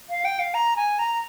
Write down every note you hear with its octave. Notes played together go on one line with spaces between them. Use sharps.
F5
G5
F5
A#5
G#5
A#5